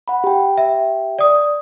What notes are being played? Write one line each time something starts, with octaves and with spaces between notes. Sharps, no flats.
F#5 B5
G4 G5
E5
D5 D#6